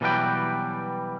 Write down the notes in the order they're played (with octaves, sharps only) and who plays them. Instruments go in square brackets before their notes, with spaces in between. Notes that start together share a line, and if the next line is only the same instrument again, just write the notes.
[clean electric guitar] B2 E3 F#3 G3 B4 G5